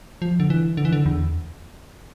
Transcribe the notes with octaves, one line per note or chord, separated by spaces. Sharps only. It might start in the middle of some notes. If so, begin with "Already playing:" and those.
F3
D3
E3
D3
E3
D3
E2